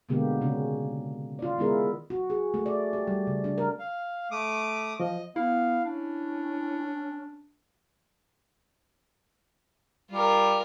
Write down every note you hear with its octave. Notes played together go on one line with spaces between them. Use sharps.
B2 D3 G#3 A#3 B3 G4
C#3 C#4
F4 D5
D#3 G#3 B3 E4 G#4 A#4
F#4
G#4
A3
D5
G4
G3
C#3
D4
A#4
F5
A3 D6 D#6
F3 D#5
B3 E4 F5
C#4 D4
G3 F4 A#4